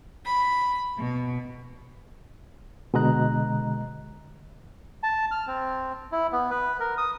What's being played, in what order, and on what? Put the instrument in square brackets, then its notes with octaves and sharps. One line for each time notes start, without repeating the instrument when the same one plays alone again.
[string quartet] B5
B2
[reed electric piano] B2 D3 G#3 D#5 A#5 F#6
[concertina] A5
F6
C4
E4
B3
B4
A#4
D#6